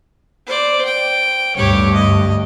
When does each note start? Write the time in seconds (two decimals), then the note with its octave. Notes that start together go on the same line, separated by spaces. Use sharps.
0.46 C5 D5
0.85 G5
1.56 D2 G2 G4 C#5
1.95 D#5